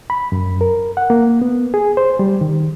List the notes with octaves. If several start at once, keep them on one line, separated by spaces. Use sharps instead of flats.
B5
F#2
A#4
F#5
A#3
B3
G#4
C5
G3
D#3